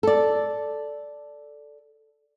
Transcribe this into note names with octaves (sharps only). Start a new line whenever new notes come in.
A4 D5